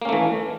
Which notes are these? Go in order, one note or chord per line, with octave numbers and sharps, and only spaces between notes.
E3 A3 A#3 C#4